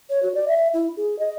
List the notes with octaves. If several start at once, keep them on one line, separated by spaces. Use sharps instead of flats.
C#5
F#4
D5
E5
E4
G#4
D#5